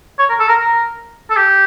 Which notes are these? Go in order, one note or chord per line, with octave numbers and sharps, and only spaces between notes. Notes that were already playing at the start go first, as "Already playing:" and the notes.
C#5
A#4
A4
A#4
A#4
A4
G4